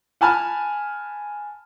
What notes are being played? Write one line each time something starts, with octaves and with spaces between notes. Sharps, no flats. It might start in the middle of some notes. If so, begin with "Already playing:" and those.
F#5 G#5 A5 B5 F6